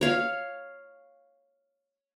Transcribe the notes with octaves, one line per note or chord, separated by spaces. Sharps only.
C#5 F5